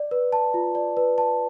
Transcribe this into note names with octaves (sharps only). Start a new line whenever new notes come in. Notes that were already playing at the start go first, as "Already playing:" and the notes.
Already playing: D5
B4
A5
F4
D5
B4
A5